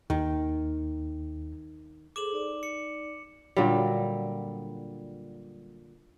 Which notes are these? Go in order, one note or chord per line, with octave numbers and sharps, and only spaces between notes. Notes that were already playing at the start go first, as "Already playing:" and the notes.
D#2 D#3
G#4 A4 C5 D6 E7 F#7
D#4 D5
C#7
A#2 D3 F#3 G3